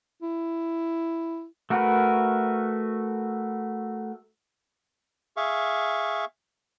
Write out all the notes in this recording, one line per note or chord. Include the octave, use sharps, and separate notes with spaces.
E4
A3 F#4 A#4 B4
G#4 E5 F5 C#6